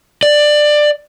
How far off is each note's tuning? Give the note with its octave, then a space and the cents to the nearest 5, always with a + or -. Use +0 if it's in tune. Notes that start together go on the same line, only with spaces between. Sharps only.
D5 +15